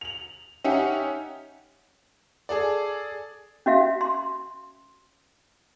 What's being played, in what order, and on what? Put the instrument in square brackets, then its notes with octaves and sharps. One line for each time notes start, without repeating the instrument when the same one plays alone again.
[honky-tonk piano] F7 F#7
C#4 D#4 G4 E5 F#5
G#4 A4 D5
[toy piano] C#4 F#4 E5 F5
C6